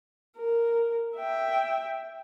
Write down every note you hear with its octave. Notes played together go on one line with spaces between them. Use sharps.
A#4
E5 G5